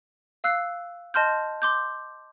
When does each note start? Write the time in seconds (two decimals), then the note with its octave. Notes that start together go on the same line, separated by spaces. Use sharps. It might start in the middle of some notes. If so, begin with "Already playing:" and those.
0.44 F5 E6 F#6 C7
1.14 D#5 A5 C6 F6 G6
1.62 C6 D6 G6